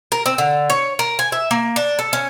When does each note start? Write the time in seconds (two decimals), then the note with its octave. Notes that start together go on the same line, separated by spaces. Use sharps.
0.12 A#4
0.26 C4
0.38 D3
0.70 C#5
0.99 A#4
1.19 G#5
1.32 E5
1.51 A#3
1.76 D4
1.99 A4
2.13 C#4